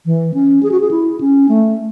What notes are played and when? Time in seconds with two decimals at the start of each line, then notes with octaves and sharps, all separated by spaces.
0.06 E3
0.34 C#4
0.63 G#4
0.71 F#4
0.80 G#4
0.91 E4
1.20 C#4
1.49 A3